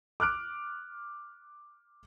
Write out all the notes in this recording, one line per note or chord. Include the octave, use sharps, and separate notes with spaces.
D6 F6 F#6 D7